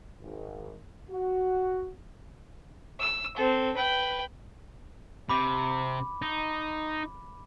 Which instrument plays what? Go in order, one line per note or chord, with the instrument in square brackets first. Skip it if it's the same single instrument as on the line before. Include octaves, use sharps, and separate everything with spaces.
[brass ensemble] G#1
F#4
[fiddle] E6
C4 A4
B4 G5
[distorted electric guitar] C3 [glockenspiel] B5 D6
[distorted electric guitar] D#4